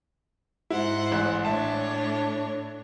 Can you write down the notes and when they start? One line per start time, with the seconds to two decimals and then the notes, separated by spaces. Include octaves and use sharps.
0.70 G#2 E4 C5 F#5
1.12 A1 F#6
1.45 A2 D4 C#5 E5 A5